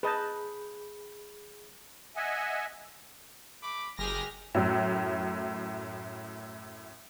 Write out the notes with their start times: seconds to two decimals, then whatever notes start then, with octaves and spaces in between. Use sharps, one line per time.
0.03 G#4 B4 D#5 A5 B5 G6
2.16 D#5 E5 F#5 G#5
3.62 A3 B5 D6
3.99 F#1 G#3 G4 G#4 F6 A#6
4.55 F#2 A2